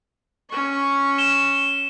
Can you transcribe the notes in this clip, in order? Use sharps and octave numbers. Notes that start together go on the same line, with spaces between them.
C#4 C#6
E7 G7